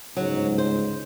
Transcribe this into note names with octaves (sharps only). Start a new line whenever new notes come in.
G1 C#2 G#2 F#3
C5